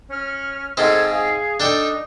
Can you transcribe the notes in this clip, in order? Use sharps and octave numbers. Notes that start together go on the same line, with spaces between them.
C#4 F6
G#2 G#3 C4 A4 F6 G#6
G#4 F5
D4 D#4 A4 G5